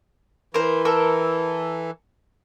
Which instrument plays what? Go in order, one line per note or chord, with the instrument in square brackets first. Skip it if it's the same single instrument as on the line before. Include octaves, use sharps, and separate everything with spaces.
[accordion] E3 [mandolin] A#4 C5
[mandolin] A4 A#4 E6